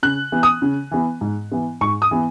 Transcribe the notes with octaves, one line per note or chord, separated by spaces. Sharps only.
C#3 F#6
E3 B3
D#6
C#3
E3 B3
G#2
E3 B3
G#2 C#6
D#6
E3 B3